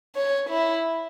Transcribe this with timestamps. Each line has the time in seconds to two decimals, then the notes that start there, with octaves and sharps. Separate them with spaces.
0.16 C#5
0.49 E4